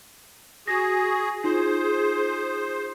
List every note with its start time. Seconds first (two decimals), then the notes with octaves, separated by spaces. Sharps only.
0.68 F#4 G#4 A#6
1.44 D#4 F4 G#4 C5